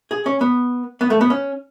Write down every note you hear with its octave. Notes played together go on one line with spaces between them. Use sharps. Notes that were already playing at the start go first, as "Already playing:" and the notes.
G#4
C#4
B3
B3
A3
B3
C#4